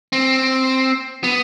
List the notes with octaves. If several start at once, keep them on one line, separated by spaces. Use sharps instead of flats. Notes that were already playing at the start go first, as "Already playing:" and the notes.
C4
B3